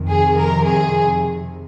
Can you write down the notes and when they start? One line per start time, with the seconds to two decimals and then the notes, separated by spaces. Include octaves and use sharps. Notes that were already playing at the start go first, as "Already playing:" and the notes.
Already playing: F2 C3 D#3
0.09 G#4
0.37 A#4
0.66 G#4